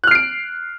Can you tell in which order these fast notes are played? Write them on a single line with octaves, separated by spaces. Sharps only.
F#6 F6 C7 D7